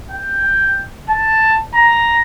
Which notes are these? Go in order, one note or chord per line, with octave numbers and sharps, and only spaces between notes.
G5
A5
A#5